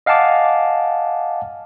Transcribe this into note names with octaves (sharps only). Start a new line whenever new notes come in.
D#5 F5 F#5 G#5 A5 D6